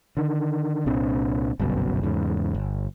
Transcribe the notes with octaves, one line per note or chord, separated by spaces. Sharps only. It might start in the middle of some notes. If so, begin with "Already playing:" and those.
D3 D#3
C2 A#2 C4 D4
G1 C2 F#2 B2
E2 G#2 C#3
G1